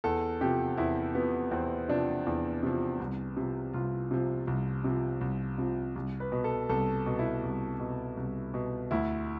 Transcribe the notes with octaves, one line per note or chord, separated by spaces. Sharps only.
E2 A4
C3 F3 G4
E2 E4
C3 F3 B3
E2 C4
C3 F3 D4
E2
C3 F3
C2
C3 F3
C2 F4
C3 F3
C2
C3 F3
C2
C3 F3
C2
B4
B2
A4
C2 A4
B2
E4
C2
B2
C2
B2
D2 E4